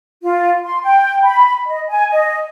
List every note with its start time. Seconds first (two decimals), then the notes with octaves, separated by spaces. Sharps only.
0.23 F4
0.64 C6
0.83 G5
1.24 B5
1.67 D#5
1.89 G#5
2.11 D#5